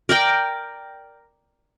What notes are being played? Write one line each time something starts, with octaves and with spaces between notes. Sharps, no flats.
A#4 D5 G5